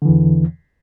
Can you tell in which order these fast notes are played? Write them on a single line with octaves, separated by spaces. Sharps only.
D3 E3 E2